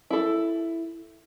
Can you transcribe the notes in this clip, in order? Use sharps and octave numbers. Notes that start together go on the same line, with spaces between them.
E4 A4